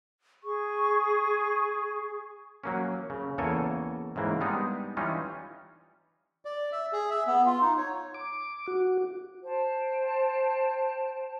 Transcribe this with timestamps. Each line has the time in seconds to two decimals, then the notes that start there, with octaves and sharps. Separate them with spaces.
0.44 G#4 C#6
2.64 F#3 A#3 C#4
3.10 C#3
3.38 E2 C#3 A#3 A4 C#5 G#5
4.16 G#2 C#3 E3 A#3
4.41 G3 G#3 B3 D4 D#4
4.97 E3 G3 C#4 D#4 F4
6.45 D5
6.72 E5
6.92 G#4
7.11 E5
7.27 B3
7.46 F4
7.61 D#4
7.78 C#5
8.14 D6
8.67 F#4
9.44 C5 G5 A5